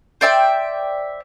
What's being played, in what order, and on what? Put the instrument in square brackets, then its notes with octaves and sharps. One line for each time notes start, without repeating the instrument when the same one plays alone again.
[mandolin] C5 D5 E5 G5